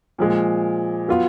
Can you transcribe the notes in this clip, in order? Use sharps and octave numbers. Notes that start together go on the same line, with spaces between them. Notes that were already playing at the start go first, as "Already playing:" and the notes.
A#2 F3 G#3
F#3 B3 F4